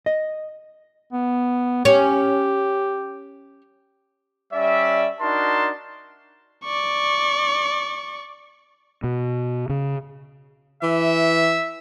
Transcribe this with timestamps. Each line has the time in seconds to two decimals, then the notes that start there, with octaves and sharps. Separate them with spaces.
0.06 D#5
1.13 B3
1.85 C#4 G4
4.53 G3 C#4 D5 E5
5.21 D4 D#4 F#4 A#4 A5 C6
6.65 D5 C#6
9.04 B2
9.69 C#3
10.83 E3 E5